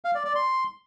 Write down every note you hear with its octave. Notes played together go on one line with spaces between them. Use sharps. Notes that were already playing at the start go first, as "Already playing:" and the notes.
F5
D5
D5
C6